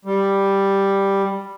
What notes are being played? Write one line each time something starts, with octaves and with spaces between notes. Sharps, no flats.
G3